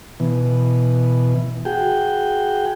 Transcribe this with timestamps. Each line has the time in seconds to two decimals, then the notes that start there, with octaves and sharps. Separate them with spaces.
0.20 B2 E3
1.65 F#4 G#4 G5